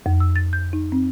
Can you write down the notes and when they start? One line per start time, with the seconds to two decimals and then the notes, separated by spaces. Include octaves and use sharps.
0.06 F2
0.20 E6
0.36 A6
0.53 G6
0.73 D#4
0.92 C4